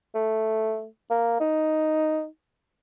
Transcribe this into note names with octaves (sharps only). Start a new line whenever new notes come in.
A3
A#3
D#4